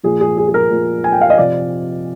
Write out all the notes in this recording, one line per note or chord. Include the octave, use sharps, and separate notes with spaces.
A#2 F3 A#3 G#4
G#4
G#4
G#4
A#4
A#2 F3 A#3
G#5
G5
F5
D#5
C3 F3 C4 D5